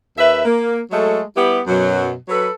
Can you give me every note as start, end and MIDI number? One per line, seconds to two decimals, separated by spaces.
0.17 0.40 39
0.17 0.40 71
0.17 0.40 76
0.45 0.80 58
0.91 1.21 54
0.91 1.21 56
0.91 1.21 57
0.91 1.21 69
1.36 1.58 55
1.36 1.58 59
1.36 1.58 64
1.36 1.58 67
1.36 1.58 71
1.67 2.13 42
1.67 2.13 47
1.67 2.13 54
2.29 2.48 54
2.29 2.48 69
2.29 2.48 71